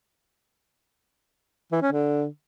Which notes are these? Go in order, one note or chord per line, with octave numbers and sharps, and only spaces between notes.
E3
C#4
D3